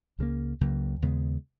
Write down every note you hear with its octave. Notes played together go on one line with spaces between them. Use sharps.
C#2 C#3 F#3 A#3
C#2 C#3 F#3 A#3
D#2 C#3 G#3 B3